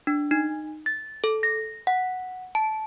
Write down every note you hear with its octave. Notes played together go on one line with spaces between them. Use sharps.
D4
D#4
A6
A4
A#6
F#5
A5